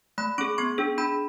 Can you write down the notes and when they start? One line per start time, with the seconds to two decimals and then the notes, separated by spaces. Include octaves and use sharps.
0.18 A3 B5
0.38 C#4 G#4 C#6
0.58 B3 C#6
0.78 D4 G#4
0.98 D4 B5